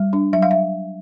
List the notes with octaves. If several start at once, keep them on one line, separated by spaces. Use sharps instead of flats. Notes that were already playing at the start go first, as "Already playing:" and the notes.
Already playing: G3
D4
F#3 E5
F5
E5